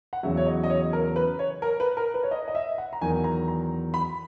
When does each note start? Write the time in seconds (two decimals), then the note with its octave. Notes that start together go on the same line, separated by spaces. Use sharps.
0.13 F#5
0.23 E2 C#3 F#3 E5
0.37 C#5
0.46 D#5
0.63 D#5
0.70 C#5
0.93 A#4
1.16 B4
1.39 C#5
1.62 A#4
1.80 B4
1.97 A#4
2.14 B4
2.23 C#5
2.31 D#5
2.48 D#5
2.55 E5
2.78 F#5
2.93 A#5
3.01 E2 D#3 F#3 G#5
3.24 A#5
3.48 A#5
3.94 B5